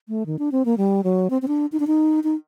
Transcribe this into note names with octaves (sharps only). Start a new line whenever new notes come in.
A3
D#3
D4
C4
A#3
G3
F#3
C4
C4
D4
D#4
D4
D#4
D#4